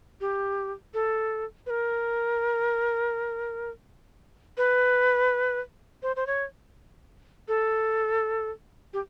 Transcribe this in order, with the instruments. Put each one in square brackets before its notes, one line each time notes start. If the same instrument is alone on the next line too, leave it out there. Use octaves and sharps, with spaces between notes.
[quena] G4
A4
B4
A#4
B4
C5
C5
C#5
A4
G4